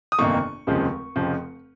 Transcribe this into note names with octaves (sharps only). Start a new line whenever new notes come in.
D#6
G1 F2 C3 D#3 A#3 C#6
F1 D#2 C#3 F3 G#3
F1 F2 C#3 F3